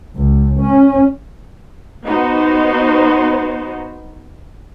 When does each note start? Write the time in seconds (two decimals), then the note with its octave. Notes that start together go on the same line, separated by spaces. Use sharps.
0.16 C#2
0.60 C#4
2.04 B3 D#4 F#4 C5